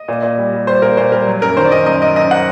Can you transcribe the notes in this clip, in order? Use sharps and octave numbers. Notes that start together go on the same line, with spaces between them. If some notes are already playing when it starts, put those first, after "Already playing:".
Already playing: D#5
A#2
A#2
G3
G3
G3 C5
A#2 A#4
A#2 C5
G3 A#4
F#3
F#2 A#4
D#3 C5
D5
D#3 D#5
F#2 D#5
F#3 D#5
F#2 D#5
F#5